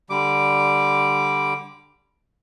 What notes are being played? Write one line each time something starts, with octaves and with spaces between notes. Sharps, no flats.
D3 G3 D6